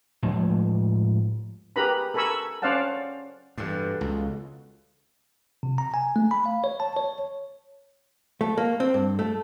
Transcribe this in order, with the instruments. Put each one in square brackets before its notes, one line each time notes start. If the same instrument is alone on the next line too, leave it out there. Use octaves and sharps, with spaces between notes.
[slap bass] A2 F3 G#3 A3
[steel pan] G4 G#4 A#4 B4 A#5 B5
A4 A#4 G#5 B5 C#6 E6
C#4 C5 D5 F5 F#5 A5
[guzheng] E2 B2 A4 [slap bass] G2
[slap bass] C#2
[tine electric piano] C3
A#5
G#5
A3
B5
F5
C#5
A5
C#5
[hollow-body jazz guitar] A3
A#3
C4
G2
A3